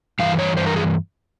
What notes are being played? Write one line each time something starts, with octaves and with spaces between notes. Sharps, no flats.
G2 E3 F5
C#5
G2 E3 C5
A#4
G#4